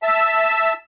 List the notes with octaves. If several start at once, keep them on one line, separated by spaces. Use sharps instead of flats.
E5 A5 E6